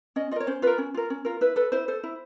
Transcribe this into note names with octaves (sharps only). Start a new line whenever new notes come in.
C#4 D#5
F4 A#4 C#5 D#5
C#4 C5
F4 A#4 B4
C#4
F4 A#4
C#4
F4 A#4
E4 B4
A4 B4
E4 C5
A4 C5
E4